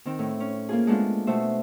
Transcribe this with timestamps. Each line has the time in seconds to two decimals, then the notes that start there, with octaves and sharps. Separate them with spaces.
0.06 D#3 C4
0.19 A2
0.40 C#4
0.69 A#3 F4 G#4
0.87 G#3 A3 B3 D4 D#4 F4
1.27 B2 A3 C5 E5